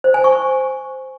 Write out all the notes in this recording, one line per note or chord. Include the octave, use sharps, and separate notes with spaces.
C5
G#5
C#6